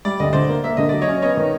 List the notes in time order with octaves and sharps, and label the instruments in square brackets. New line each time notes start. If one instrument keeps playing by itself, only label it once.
[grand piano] G3 [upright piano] D5
[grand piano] D2 [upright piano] D#5
[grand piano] D3 [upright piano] C5 D5
[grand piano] A#3
[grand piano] A#3 [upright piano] E5
[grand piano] D3 [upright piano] D#5
[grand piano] F#3 [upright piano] D5
[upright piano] C#5 D#5
[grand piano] C#4
[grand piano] B3 [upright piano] C#5 D#5
[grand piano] D#3